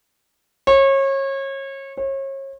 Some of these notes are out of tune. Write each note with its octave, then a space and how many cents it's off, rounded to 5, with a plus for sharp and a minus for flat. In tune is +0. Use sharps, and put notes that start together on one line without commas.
C#5 -30
C#5 -35